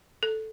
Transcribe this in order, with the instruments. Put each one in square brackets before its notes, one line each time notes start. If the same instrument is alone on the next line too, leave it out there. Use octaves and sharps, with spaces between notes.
[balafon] A4